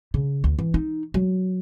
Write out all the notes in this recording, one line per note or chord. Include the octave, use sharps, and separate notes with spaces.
C#3
D2
E3
D#4
F#3